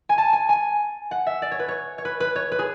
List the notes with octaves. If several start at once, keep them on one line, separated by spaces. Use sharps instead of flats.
G#5
A5
G#5
G#5
F#5
E5
D5
C#5
B4
C#5
C#5
B4
B4
C#5
B4
G#4